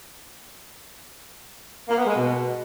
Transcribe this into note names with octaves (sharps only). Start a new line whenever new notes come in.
A#3
B3
G#3
B2